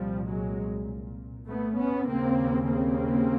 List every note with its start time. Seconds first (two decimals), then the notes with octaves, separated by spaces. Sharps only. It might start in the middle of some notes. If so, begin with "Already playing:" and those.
Already playing: C2 A#2 F3 G3
0.26 F#3 G#3
1.46 A3 B3
1.76 B3 C#4
2.05 D#2 C#3 A#3 C4
2.65 A#3 C4